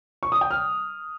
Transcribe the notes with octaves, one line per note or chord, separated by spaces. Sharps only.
C#6
D#6
G5
F6